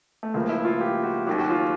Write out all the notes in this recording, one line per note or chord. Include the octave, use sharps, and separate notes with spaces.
A3
C#2 C#3 F3 A#3
E4
F4
G4
F#4
D#2 D#3 F#3 G4
F#4
F4